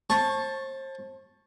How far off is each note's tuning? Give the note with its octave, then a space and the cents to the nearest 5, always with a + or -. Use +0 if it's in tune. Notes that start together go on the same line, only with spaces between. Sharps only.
C5 +35 A5 +0 C#6 -10